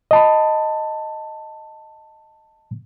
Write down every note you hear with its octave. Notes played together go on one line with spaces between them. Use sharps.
D#5 A5 B5